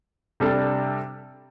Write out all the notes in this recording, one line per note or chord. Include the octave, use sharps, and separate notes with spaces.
C3 G3 D4 A4